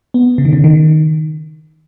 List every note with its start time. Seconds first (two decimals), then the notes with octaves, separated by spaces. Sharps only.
0.14 B3
0.38 C#3
0.45 D#3
0.53 C#3
0.64 D#3